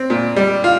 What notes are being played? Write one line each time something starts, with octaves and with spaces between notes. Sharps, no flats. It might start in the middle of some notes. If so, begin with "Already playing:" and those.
Already playing: C4
A#2
G3
F4